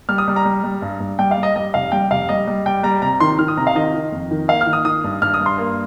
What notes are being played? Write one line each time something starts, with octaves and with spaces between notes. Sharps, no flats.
G3 F6
D#6
G3
A#5
G3
G3
G2
G2
G3 G5
F5
G3
D#5
G3 D#5
F1 F5
G3 G5
F1 F5
G3 D#5
G3
G3 G5
G3 A#5
C3 A#5
D#3 C6
D#3 F6
D#6
C3 A#5
F5
D#3 D#5
D#3
F2
D#3
A#3 F5
F6
D#3
D#6
D#3 D#6
G2
G2 F6
D#6
G2
C6
A#3